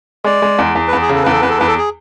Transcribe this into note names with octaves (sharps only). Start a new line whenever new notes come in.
G#3 D5
G#3
E2
E2
B4
E2
G#4
C#3 A4
E2 B4
A4
E2 B4
A4
E2 B4
A4
G#4